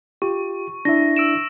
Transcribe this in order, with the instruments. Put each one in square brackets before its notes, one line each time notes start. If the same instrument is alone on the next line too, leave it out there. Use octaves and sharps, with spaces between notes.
[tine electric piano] F4 G4 [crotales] C#6
[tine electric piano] D4 E4 E5 [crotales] A#6
[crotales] E6 D7 E7